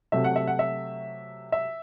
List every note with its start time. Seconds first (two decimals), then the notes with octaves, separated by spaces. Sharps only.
0.12 C3 F#3 A3 E5
0.24 F#5
0.36 E5
0.47 F#5
0.59 E5
1.52 E5